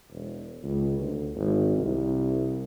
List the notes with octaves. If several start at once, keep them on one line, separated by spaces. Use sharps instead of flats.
E1
C#2
D2
G#1
C2